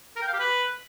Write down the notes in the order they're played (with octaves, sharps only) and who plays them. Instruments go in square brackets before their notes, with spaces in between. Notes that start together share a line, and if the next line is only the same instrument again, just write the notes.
[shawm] A#4
G5
F5
G4
B4